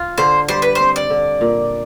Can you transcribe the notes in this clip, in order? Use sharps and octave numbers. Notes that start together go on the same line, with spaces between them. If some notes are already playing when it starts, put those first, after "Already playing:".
Already playing: F4
D3 C5
G3 C5
B4
C5
C4
D5
D3
A#2